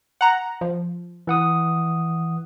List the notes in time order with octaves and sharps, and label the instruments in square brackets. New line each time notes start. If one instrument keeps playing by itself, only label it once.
[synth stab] F#5 A#5
F3
[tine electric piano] E3 F#5 D#6